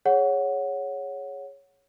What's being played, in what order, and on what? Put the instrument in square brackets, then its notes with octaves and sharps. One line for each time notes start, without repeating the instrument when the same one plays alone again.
[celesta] G#4 C#5 F#5